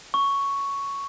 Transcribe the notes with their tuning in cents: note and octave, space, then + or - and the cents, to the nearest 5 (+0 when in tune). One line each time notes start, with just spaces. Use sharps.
C#6 +5